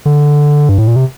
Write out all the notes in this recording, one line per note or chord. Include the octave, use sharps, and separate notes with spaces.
D3
G2
A2
A#2
C3